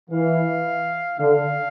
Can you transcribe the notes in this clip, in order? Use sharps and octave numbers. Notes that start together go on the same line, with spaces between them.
E3 F5
D3 F5